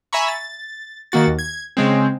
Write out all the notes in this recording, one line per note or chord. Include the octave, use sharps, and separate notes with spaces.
E5 G#5 A#5 B5 C#6
A6
D#3 A#3 F#4 A6
D#2
G#6
C#3 G#3 C4